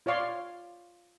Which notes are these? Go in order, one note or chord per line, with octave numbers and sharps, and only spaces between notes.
F4 C#5 D5 F5 C6